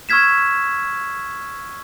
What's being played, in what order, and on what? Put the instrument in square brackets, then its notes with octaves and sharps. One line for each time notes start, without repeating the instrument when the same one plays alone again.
[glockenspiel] C#6 E6 F6 G#6 B6 E7